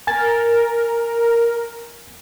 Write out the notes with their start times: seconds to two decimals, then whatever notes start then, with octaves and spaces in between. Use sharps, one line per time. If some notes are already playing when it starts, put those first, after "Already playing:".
0.07 A#4 G#5 A6